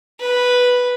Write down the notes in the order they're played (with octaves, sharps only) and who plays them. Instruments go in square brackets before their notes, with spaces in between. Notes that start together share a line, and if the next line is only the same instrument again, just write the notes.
[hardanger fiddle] B4